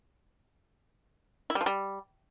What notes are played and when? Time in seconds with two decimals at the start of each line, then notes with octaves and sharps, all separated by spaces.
1.50 E4
1.55 G3
1.61 F3
1.66 G3